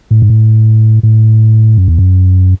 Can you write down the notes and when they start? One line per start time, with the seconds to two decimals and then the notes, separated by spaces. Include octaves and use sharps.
0.11 A2
0.22 G#2
0.30 A2
1.03 A2
1.78 F#2
1.88 E2
1.98 F#2